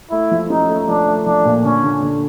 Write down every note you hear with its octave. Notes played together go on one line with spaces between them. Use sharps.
A3 E4
F3
C#4 D#4
A3
F3 D4
A3
F3 D4
A#2
D3 C#4
D3
D3